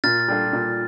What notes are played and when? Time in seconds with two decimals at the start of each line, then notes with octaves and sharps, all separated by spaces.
0.04 A#2 F6 A6
0.28 G3 D4 F4 A4
0.53 A#2